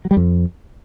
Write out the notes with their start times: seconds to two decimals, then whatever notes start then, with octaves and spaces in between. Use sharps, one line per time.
0.05 F#3
0.11 G3
0.17 F2